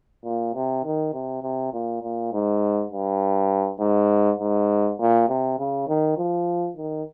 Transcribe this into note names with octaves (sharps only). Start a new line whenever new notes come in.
A#2
C3
D#3
C3
C3
A#2
A#2
G#2
G2
G#2
G#2
A#2
C3
C#3
D#3
F3
D#3